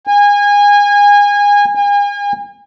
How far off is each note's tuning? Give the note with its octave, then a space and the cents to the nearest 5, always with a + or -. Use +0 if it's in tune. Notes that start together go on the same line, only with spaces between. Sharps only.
G#5 -25
G#5 -40